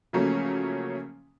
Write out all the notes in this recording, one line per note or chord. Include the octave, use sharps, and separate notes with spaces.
C#3 F3 F#3 A3 A#3 C#4